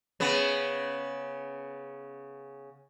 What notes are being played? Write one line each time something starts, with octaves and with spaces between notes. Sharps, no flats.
C#3 B3